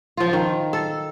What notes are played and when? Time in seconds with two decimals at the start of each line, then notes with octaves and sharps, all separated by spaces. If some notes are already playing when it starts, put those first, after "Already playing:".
0.17 F3 F4
0.33 D#3
0.73 A4